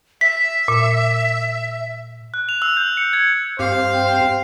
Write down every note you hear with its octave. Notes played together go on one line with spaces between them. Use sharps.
E5 B6
A#2
F#6
F7
E6
G6
C#7
G#6
G2 C4 G4 C5 F5
G5